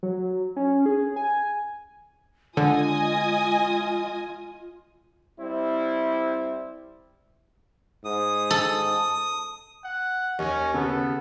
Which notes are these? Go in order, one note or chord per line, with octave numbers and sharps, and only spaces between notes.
F#3
C#4
G#4
G#5
D3 G#3 F4 D#5 G#5 D#6
G3 C4 E4
G#2 D#6
A4
F#5
D#2 C#4 D#5
C#3 B3 A4